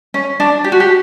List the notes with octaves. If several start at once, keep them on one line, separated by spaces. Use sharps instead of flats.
C#4
D4
G4
F#4
G4